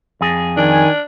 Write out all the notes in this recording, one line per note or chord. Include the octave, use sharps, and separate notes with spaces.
F2 G#4
D#3 D4 G#5